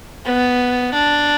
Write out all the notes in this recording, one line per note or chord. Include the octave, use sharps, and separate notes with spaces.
B3
D4